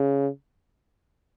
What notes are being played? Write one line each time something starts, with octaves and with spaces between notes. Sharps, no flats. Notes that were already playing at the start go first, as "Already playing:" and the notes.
Already playing: C#3